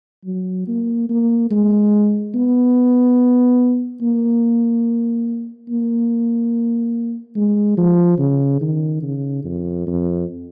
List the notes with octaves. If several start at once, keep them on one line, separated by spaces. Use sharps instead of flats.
F#3
A#3
A#3
G#3
B3
A#3
A#3
G#3
F3
C#3
D#3
C#3
F2
F2